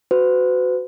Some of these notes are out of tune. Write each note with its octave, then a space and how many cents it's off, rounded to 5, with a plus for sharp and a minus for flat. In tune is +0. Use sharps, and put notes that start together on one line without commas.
F#4 +0 B4 +40